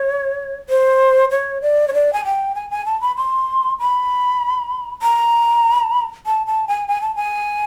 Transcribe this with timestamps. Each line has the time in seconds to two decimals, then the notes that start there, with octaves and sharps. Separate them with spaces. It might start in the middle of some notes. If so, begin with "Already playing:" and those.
Already playing: C#5
0.69 C5
1.31 C#5
1.62 D5
1.88 C#5
1.94 D5
2.13 G#5
2.25 G5
2.55 G#5
2.70 G#5
2.86 A5
3.01 B5
3.17 C6
3.79 B5
5.02 A#5
6.26 A5
6.47 A5
6.68 G#5
6.88 G#5
7.01 A5
7.16 G#5